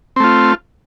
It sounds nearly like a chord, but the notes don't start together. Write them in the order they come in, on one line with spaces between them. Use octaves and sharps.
C4 A3 F4